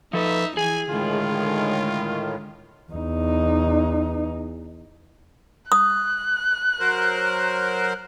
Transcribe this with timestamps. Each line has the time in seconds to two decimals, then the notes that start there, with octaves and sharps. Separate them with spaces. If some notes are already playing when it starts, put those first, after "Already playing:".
0.13 F3 D#4 A4 B4 E5
0.57 E3 G#4 G#5
0.90 A2 D3 D#3 G#3 F4
2.91 E2 D#4
5.72 D#6 F#6
6.79 F#3 A#4 C5